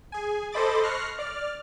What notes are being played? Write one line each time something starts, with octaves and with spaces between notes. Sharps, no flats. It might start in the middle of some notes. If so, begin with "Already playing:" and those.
G#4 G#5
A4 C5 D#5 B5 D6 A6
C#6 F6 F#6 A#6 C7
D5 F6